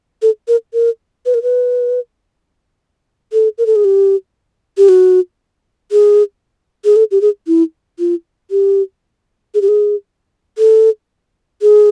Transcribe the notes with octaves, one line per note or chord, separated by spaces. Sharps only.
A4
A#4
A#4
B4
A#4
B4
A4
A#4
A4
G#4
G4
G4
F#4
G#4
G#4
A4
G4
G#4
E4
F4
G4
G#4
G4
G#4
A4
G#4